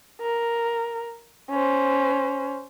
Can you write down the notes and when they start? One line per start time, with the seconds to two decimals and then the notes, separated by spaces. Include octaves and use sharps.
0.21 A#4
1.50 C#4 C5